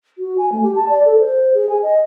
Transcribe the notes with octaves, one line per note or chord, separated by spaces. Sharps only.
F#4
G#5
A3
G4
A5
D5
A4
C5
G#4
G#5
D#5